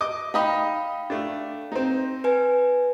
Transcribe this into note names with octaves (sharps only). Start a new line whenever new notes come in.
D#5 D6
D#4 D#5 F5 G5 B5
A3 D4
C4 D#4
B4 G#5